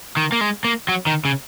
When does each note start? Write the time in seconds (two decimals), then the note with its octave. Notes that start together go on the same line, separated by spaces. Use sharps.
0.17 D#3
0.32 A#3
0.41 G#3
0.64 A#3
0.88 F#3
1.07 D#3
1.25 C#3